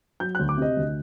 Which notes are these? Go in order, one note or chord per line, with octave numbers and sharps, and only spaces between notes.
F#3 G6
F#6
D2
D6
C3 D#5
D2